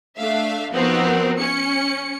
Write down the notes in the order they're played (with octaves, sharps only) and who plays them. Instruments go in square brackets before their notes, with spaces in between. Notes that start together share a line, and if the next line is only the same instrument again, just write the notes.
[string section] A3 D4 E5 F5
F3 B3 C4 D#4 F#4 A#4
C#4 C#7